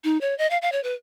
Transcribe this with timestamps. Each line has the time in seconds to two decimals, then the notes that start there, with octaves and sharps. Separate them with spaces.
0.04 D#4
0.21 C#5
0.38 D#5
0.51 F5
0.62 F5
0.72 C#5
0.84 B4